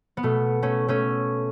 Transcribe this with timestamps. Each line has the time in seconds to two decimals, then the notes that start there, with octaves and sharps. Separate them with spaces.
0.17 B3
0.23 B2 A3
0.62 A3 C#4
0.88 A3 C#4